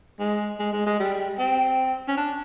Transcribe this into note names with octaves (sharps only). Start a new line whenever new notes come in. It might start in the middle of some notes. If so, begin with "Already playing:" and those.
G#3
G#3
G#3
G#3
G3
C4
C#4
D4